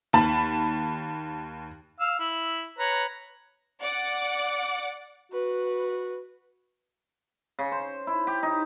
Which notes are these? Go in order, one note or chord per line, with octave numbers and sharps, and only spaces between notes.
D#2 A5 B5
F5 E6
E4
B4 C#5 A#5
D5 F#5 D6
F#4 B4
C#3
C5
E4
G4
D#4